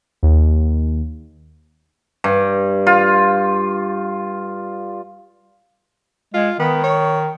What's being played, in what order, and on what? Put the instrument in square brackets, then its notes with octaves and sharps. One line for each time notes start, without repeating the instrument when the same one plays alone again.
[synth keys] D#2
[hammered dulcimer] G2
F4
[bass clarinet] G#3 [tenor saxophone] F4
[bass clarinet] D#3 [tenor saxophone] B3
[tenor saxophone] C#5